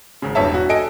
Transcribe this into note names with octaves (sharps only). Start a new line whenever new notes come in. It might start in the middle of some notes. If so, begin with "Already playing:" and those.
G#1 C#3
E1 E2 G2 C#5 E5 A5
F#4
A4 D#5 G#5 D7